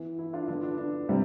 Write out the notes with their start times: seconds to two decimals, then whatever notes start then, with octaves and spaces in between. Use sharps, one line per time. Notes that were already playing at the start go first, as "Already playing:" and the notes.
Already playing: E3 B3
0.19 E4
0.33 D4 F4
0.48 D3 F3 B3 D4
0.63 D4
0.78 D4
1.09 C3 G3 C4